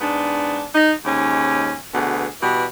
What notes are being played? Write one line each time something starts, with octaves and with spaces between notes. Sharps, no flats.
G#2 B3 D4
D#4
D#2 G#2 C#4
D2 B2 B3 G#4
B2 E3 G3